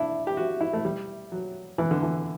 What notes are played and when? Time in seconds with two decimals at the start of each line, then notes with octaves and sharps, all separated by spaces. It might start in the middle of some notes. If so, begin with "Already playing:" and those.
Already playing: D4 E4
0.27 G4
0.37 F#4
0.61 E4
0.73 A3
0.85 G3
1.32 F#3
1.78 E3
1.91 D3
2.03 E3